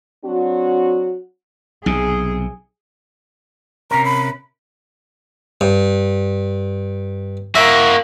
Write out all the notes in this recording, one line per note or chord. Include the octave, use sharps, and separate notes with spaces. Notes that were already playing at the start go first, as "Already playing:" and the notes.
F#3 C4 D4 F#4
B1 C3 G#4
C3 C#4 A#4 A#5
B5
G2
A#3 F#4 E5